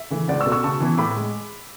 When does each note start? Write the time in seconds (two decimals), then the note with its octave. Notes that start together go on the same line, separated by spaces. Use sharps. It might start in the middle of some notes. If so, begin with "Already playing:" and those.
Already playing: E5
0.10 C#3 E3 A3
0.28 C#2 D5 F#5
0.40 C#6 E6
0.46 B2 A3
0.52 C#6 E6
0.64 C#3 A5 C#6
0.80 E3 B3 E4
0.98 A2 B5 D6
1.16 G#3